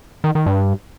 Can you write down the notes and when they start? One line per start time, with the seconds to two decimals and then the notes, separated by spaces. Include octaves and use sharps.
0.24 D#3
0.35 D#3
0.46 G2